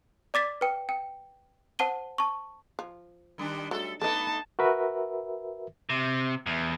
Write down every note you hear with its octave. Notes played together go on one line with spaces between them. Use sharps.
D5 D6 A6 B6
B4 G5
G5
C5 F#5 A5 D#7 G7
A5 C#6
F3
D#3 G3 D4
F#3 G3 A3 A4
A3 B3 D#4 A4 D#5 A5
F#4 A#4 B4 E5
C3
E2